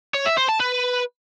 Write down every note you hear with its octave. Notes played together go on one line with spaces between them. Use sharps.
C#5
E5
C5
A5
B4